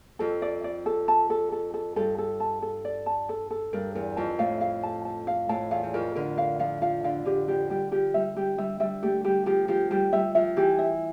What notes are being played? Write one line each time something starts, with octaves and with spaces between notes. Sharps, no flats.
F2 A4
D5
D5
A4
A5
A4
A4
A4
G2 A4
A4
A5
A4
D5
A5
A4
A4
G2 A#4
E2 A#4
F2 A5
A2 F5
F5
A5
A5
F5
A2 A5
E2 F5
E2
F2 A#4
D3 A#4
F5
F3 F5
F3 F5
D3 F5
D3 G4
F3 G4
G3 G4
F3 G4
G3 E5
G3 G4
G3 E5
G3 E5
A3 G4
G3 G4
F3 G4
F3 G4
G3 G4
G3 E5
F3 E5
E3 G4
E5